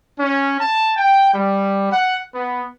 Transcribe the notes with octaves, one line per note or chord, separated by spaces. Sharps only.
C#4
A5
G5
G3
F#5
B3